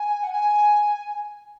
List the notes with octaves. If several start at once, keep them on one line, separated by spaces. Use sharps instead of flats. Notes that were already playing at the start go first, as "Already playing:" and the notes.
Already playing: G#5
F#5
G#5